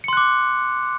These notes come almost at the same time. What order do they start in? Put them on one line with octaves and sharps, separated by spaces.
C#7 C6 F#6 D6